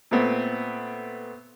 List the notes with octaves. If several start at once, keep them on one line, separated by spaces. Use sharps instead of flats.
A#2 A3 B3 C4